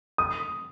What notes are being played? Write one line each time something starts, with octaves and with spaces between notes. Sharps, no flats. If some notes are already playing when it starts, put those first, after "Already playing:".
D#6